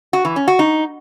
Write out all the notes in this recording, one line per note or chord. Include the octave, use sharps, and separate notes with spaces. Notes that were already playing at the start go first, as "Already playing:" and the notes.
F#4
E3
C#4
F#4
D#4